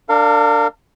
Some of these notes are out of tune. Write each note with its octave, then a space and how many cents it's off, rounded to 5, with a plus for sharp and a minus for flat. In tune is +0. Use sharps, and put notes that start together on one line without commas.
D4 +0 A#4 -40 F5 +0